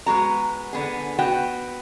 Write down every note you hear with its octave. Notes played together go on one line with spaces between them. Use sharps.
G#3 B3 F#4 A#5
D3 B3 G#4
B3 F#4 G5